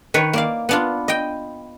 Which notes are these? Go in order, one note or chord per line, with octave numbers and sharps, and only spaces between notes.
D#3 B4 C#5
A#3 D5 F5
B3 D4 F4
D#5 G5